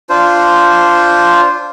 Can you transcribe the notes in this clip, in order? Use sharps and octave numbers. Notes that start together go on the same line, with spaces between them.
D4 F4 C5